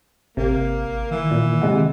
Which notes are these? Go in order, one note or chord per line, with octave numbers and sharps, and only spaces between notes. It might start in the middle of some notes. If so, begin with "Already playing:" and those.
G#1 C3 A#3
D#3 E3
A#2
C3 D#3 G#3 F#5